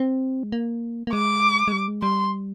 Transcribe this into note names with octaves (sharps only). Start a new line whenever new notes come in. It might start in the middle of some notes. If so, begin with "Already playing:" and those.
Already playing: C4
G#3
A#3
A#3
G#3 D6
G#3
G3
G#3
G3 C6